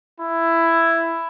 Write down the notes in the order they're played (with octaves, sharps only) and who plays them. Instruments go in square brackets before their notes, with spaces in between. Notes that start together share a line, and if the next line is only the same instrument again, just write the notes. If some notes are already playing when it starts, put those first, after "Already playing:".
[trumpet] E4